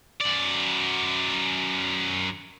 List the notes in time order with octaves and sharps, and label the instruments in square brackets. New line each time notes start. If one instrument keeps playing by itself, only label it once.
[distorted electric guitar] F#2 D5